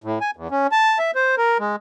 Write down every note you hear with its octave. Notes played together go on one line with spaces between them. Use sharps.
A2
G#5
E2
C#4
A5
E5
C5
A#4
G#3